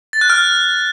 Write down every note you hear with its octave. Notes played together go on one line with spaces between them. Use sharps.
A6
F#6
F6